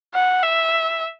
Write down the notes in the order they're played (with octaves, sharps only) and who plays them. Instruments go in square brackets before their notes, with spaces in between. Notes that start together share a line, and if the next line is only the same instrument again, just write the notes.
[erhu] F#5
E5